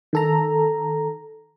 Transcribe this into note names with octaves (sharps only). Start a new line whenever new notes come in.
D#3 A4 A#5